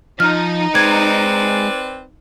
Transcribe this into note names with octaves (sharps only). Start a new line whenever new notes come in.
F3 D#4 F6
G#3 C4 B4 D5 G#6